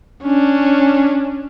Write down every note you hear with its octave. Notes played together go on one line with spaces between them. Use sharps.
C#4 D4